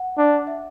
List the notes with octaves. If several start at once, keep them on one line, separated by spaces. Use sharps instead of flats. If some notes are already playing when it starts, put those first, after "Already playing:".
Already playing: F#5
D4
E5